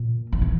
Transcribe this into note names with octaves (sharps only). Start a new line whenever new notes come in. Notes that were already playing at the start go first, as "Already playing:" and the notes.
Already playing: A#2
D#3
E3